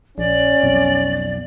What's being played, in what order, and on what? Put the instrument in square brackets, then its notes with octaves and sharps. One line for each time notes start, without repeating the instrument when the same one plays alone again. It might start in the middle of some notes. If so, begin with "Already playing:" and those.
[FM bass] A#1 [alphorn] C#4 [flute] D5
[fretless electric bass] B1 [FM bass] F2